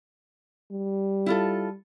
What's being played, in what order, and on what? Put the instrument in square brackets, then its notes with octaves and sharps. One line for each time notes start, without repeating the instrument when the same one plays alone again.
[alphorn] G3
[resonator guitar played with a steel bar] E4 F4 A4